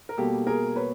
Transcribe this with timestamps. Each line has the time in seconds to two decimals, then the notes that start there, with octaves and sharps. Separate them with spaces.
0.09 A#4
0.17 B2 G3 A#3 G4 A4
0.47 G#4 A#4
0.76 B4 C#5